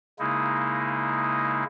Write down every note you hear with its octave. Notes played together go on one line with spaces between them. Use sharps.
C#3 G#3 A#3 D#4 E4